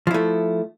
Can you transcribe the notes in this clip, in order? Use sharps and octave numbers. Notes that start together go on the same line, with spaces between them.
F3 A3 E4